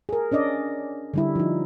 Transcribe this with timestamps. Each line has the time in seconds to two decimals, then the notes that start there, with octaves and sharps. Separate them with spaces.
0.09 G#4 A#4
0.32 C#4 D4 D5 D#5
1.14 D3 G3 E4
1.35 F3 D#4